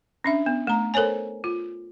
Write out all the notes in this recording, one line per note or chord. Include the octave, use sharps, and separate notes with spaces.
C#4 D4 E5
B3
A3 A#5
A4 A#4 C5 C#5 G#5
F4